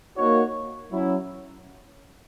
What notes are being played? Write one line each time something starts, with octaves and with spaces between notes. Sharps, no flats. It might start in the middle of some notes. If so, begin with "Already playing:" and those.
A#3 D#4 F#4 C#5
F#3 C#4 E4